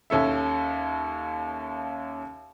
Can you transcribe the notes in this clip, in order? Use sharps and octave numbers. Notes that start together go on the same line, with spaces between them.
D#2 C#4 A4 E5